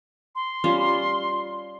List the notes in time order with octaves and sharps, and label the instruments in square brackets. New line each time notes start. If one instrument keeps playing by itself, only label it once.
[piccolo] C6
[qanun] G3 C#4 F4